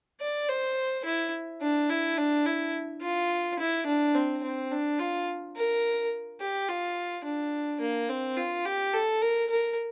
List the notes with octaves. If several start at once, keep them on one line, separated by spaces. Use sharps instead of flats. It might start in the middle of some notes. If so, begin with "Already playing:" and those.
D5
C5
E4
D4
E4
D4
E4
F4
E4
D4
C4
C4
D4
F4
A#4
G4
F4
D4
A#3
C4
F4
G4
A4
A#4
A#4